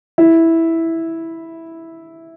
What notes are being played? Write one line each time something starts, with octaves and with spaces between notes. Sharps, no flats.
E4